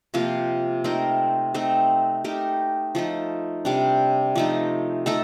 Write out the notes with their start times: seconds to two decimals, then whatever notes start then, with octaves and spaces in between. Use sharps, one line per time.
0.14 C3 F3 A#3 F4
0.84 A3 C4 D#4 A#4
1.54 A3 C4 D#4
2.24 A3 D#4 G4 A#4
2.95 F3 A3 D#4
3.65 C3 G3 D4
4.36 F3 A3 D#4
5.06 A3 D#4 A4